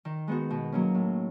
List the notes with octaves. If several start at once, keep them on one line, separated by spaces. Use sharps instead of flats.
D#3
G#3 B3 D#4 F#4
B2
F#3 A#3 C#4
A2